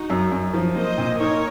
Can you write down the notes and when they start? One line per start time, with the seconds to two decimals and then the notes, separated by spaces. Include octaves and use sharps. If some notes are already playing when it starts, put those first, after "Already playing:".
Already playing: D#4 F#4
0.10 F#2
0.31 F#2
0.54 F3
0.76 A#3 C5 D#5
0.98 A#2
1.19 D#4 A#4 C#5